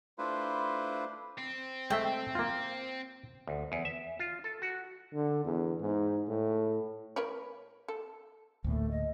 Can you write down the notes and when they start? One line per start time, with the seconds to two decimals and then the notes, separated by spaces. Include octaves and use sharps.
0.18 A3 D4 E4 F4 B4 C5
1.38 C4
1.90 G#3 A3 E5 G5
2.35 A#3 F4
3.47 D2
3.72 E2
3.85 E5
4.19 F4
4.44 A4
4.62 F#4
5.14 D3
5.45 E2
5.80 G#2
6.28 A2
7.16 A#4 B4 C#5
7.88 A4
8.64 D2 A2 A3 A#3
8.91 D#5